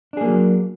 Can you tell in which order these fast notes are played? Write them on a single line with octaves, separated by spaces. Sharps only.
D4 G#4 A#3 F#3